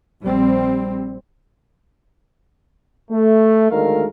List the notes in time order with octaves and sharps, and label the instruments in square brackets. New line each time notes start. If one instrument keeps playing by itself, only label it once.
[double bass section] A#1 G3 C4
[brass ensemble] A3
D2 D#3 G#3 A3 A#4 F5